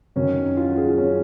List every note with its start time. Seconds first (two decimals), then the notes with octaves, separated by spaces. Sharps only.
0.16 F#2 D#3 F#3 C#4
0.57 F4
0.68 F#4
0.78 G#4
0.88 F4
0.98 C#4